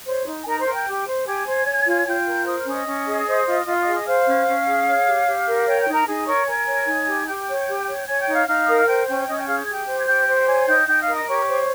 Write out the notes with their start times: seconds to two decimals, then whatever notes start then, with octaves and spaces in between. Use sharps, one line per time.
0.06 C5 C#5 C6
0.25 D#4
0.41 G#5
0.45 D#4 A#4 A#5
0.59 C5 C6
0.66 A#4
0.73 G5 G6
0.86 G4
1.06 C5
1.26 G4 G#5 G#6
1.46 C5
1.66 C#5
1.86 F4
2.06 F4 G5 G6
2.26 A#4
2.46 C5 D#6
2.57 F6
2.66 C#4 D#5 D#6
2.87 C#4
3.07 G#4
3.27 C5
3.46 F4
3.66 F4
3.80 D#5 D#6
3.86 G#4
3.93 D#5 D#6
4.06 C5 F5 F6
4.27 C#4
4.47 C#4
4.67 G#4
4.87 C#5
5.07 G4
5.27 G4
5.46 A#4
5.67 C#5 G5 G6
5.79 G5 G6
5.87 D#4
5.93 A#4 A#5
6.07 D#4 G#4 G#5
6.26 A#4 C#5 C#6
6.47 A#4 G#5 G#6
6.67 C#5
6.86 D#4
7.06 G4
7.26 G4 G5 G6
7.47 C#5
7.68 G4
7.87 C#5
8.07 C#5 G#5 G#6
8.20 G5 G6
8.27 D#4
8.33 F5 F6
8.47 D#4 F5 F6
8.65 A#4 D#6
8.76 F6
8.86 C5 G5 G6
9.07 C#4 G5 G6
9.27 C#4 D#5 D#6
9.37 G5 G6
9.47 G#4 F5 F6
9.57 G6
9.64 G#6
9.68 G4 G5 G6
9.87 C5
9.98 G#6
10.07 G4 G5 G6
10.27 C5
10.47 C#5 G#5 G#6
10.67 D#4 G5 G6
10.87 D#4 G5 G6
11.00 F5 F6
11.08 A#4
11.14 D#5 D#6
11.27 G4 C#5 C#6
11.48 C5